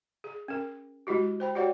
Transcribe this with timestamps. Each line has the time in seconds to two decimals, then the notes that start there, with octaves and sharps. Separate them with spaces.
0.24 G#4
0.48 C#4 A#4
1.07 G#3 E4 F#4 G4
1.40 C5 G5 B5
1.55 F#4 G4 C#5 D5 F#5 G5